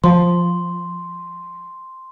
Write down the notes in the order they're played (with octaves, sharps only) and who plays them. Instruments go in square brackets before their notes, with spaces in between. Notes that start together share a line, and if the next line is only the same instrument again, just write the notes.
[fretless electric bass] F3 [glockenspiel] C6